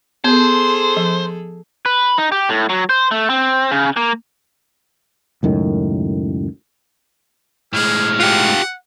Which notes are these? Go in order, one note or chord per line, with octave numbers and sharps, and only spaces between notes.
B3 G#4 A4 C5
F3
B4
D#4
G4
A2
F#3
C5
A3
C4
C#3
A#3
C#2 F#2 A2 D#3
A2 G#3 G#4 F6
F4 G4 F#5